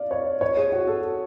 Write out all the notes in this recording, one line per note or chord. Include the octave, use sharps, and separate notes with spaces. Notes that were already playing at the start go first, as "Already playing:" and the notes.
Already playing: D5 F5
C#5
C#5
G#4
F#4
A4